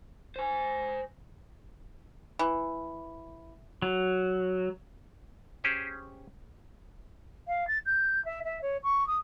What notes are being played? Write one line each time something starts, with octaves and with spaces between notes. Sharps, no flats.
C5 G#5
E3
F#3
C#4 G4 G#4 C5
F5
A6
G6
E5
E5
C#5
C#6
D#6